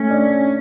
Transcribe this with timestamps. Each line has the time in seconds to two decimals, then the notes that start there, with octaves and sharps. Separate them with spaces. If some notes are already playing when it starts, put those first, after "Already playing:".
Already playing: A3 C#4
0.10 D4